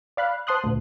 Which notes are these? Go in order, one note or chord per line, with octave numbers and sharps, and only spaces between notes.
D5 F5 B5 F#6
C5 A5 C6 D#6 F#6
D2 A#2